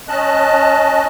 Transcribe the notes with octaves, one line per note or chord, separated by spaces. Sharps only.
C#4 D#5 A5 F#6